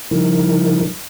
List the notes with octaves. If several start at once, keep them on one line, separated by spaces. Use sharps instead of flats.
C#3 F3 G3 D#4 E4 A#4